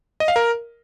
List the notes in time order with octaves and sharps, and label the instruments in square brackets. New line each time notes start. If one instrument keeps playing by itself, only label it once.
[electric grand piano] D#5
F5
A#4